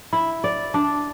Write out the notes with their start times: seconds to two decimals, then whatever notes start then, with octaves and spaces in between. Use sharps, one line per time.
0.13 E4
0.44 D5
0.74 D4